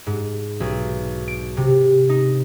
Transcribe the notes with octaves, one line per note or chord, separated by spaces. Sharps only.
G#2
B1
D7
C3
D#4